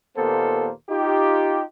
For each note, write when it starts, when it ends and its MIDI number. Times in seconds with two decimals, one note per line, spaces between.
0.17 0.70 39
0.17 0.70 46
0.17 0.70 58
0.17 0.70 59
0.17 0.70 69
0.17 0.70 72
0.90 1.63 63
0.90 1.63 65
0.90 1.63 67